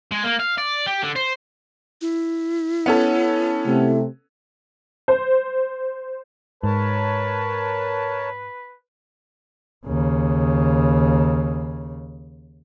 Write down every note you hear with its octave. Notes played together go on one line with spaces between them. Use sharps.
G#3
A#3
F5
D5
G4
D3
C5
E4
B3 C#4 A4
C3 A3
C5
G#2 A#4 B4 C#5 A5
D#2 C#3